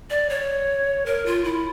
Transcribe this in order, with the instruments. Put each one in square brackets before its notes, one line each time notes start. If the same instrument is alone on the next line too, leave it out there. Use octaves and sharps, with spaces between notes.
[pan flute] D5
C#5
A#4
F4
E4